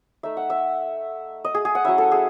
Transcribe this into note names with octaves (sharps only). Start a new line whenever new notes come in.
A3 D#4 E5
F#5
E5
D#5
G#4
G#4
F#5
F#3 C#4 E4 E5
A4
G#4